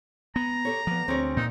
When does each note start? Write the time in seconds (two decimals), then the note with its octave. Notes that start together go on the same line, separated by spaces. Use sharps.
0.36 B3 A#5
0.65 G4 A4 C#5
0.87 F3 B3 D5
1.08 D2 C4 G#4 C#5
1.37 A#2 D#4